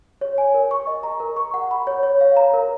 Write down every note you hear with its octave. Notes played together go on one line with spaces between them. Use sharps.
C#5
G#5
A#4
C#6
D#5
A#5
A#4
C#6
F#5
B5
C#5
C#5
F5
A#5
A#4